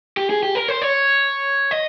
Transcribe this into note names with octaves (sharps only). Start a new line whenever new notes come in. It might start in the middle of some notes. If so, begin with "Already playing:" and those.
G4
G#4
G4
A#4
C5
C#5
D#5